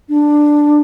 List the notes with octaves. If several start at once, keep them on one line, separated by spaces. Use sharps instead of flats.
D4